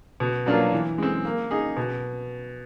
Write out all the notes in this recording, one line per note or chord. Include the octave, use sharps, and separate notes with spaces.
B2
F#3 A#3 D4 F4
E3
G#3 C4
A#3
D#4 G#4
B2